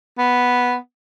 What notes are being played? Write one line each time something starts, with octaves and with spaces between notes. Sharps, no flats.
B3